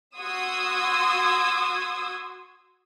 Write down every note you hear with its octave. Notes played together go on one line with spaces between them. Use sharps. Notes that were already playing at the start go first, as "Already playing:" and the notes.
F#4 C6 D#6 E6 G#6